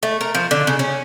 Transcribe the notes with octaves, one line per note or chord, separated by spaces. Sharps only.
A3
A#4
F3
D3
C#3
C#4